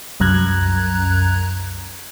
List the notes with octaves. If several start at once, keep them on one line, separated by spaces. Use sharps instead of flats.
C2 F#2 A#5 F#6 G#6